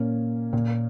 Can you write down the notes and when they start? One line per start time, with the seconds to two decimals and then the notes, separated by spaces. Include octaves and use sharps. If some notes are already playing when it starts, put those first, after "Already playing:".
Already playing: A#2 A#3 C#4
0.53 A#2